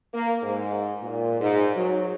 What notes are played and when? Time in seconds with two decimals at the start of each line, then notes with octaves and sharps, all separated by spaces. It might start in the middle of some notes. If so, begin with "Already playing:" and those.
0.14 A#3
0.43 G#2
1.01 A#2
1.41 G#2
1.76 F#3